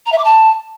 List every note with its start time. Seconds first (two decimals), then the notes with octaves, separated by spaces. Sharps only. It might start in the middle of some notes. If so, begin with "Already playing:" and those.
0.06 A#5
0.12 E5
0.18 D6
0.24 A5